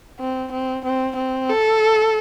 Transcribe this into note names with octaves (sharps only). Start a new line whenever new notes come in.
C4
C4
C4
C4
A4